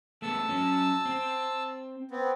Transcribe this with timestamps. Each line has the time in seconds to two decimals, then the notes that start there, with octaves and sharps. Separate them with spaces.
0.22 A3 B3 A5 E6
0.49 F#3 C#4
1.05 C4
2.11 B3 C4